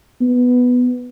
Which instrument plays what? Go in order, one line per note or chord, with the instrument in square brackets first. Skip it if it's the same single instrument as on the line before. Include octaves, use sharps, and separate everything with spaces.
[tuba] B3